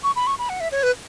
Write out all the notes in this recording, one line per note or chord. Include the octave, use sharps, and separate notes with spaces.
C#6
B5
C#6
B5
F#5
E5
C#5
B4